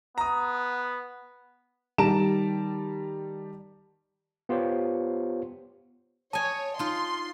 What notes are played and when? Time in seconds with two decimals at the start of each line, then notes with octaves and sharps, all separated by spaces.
0.18 B3 A#5 D#6
1.98 D#3 G3 A5 A#5 D7 E7
4.49 B3 F4 G4 C5 C#5
6.33 C#5 D#5 G#5 A5
6.79 D#4 F4 C6